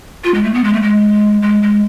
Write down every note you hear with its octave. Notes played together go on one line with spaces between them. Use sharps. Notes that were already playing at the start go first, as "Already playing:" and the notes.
F4
G#3
A3
B3
G#3
A3
G#3
G#3
G#3